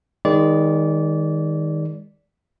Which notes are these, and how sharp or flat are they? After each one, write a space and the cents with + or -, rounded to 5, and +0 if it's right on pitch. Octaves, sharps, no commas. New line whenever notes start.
D#3 +10 G#3 -30 D5 -25